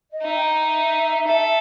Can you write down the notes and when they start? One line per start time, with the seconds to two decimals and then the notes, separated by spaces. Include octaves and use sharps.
0.12 D#5
0.22 D#4 E5
0.35 G5
0.62 E5
1.28 A4